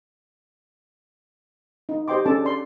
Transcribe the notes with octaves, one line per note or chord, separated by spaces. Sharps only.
D#4
G4 C5 D#5 G5 C6 D6
C#4 D4 G#4 A4 A5 D6
D5 C6